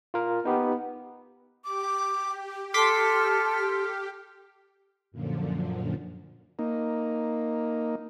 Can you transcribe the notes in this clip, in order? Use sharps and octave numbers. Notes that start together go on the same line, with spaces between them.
F4 A#4
B3 D#4 G4
G4 D6
A4 C6 D6 F6 B6
F#2 A#2 D3 F3
A#3 D#4